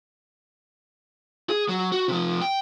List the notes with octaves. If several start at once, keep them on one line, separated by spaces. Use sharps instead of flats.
G#4
F#3
F#4
C3 F3
G5